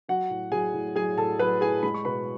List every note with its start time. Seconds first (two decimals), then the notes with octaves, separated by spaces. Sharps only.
0.08 F#3 F#4 F#5
0.30 A2
0.52 F#3 G#4 G#5
0.74 A2
0.96 F#3 G#4 G#5
1.17 A2 A4 A5
1.39 F#3 B4 B5
1.61 A2 G#4 G#5
1.83 G#3 B5
1.94 C#6
2.05 B2 B4 B5